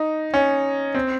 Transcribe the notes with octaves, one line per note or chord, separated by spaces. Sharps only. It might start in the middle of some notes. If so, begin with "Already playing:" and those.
Already playing: D#4
C#4
C4